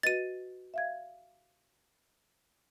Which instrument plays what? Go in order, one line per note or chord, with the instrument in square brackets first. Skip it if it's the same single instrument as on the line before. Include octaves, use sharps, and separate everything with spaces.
[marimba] F#4 B4 D#5 [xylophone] A6 D#7
[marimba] E5 F5 G#6